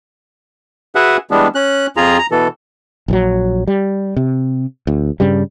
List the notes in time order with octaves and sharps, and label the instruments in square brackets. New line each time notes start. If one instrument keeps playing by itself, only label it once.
[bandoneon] F#4 G#4 B4 E5 F#5
E3 G3 G#3 B3 D4
C#4 F#6
F2 F4 G#4 A#5
A#5
B2 E3 A4
[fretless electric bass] A#1 E3 F#3
G3
C3
D2
G2 C#3 G3